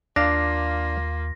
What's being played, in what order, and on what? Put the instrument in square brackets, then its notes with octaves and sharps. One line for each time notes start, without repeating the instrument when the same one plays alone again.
[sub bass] D#2 [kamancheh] A#3 F4 [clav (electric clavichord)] D4 F5 [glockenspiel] A#6